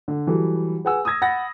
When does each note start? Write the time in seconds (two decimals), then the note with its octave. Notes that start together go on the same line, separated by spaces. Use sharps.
0.08 D3
0.27 E3 F#3 G3 A4
0.85 G#4 B4 F#5 G#5 E6
1.05 D#6 E6 G#6 A#6
1.22 F#5 B5 A6 A#6